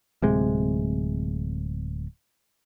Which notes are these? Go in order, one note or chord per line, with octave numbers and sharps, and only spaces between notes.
D1 C3 G#3